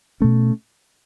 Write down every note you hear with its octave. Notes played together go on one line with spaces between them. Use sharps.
B2 A3 C#4